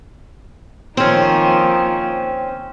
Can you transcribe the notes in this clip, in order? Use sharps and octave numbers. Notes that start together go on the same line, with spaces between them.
D#3 F3 A#3 C4 C#4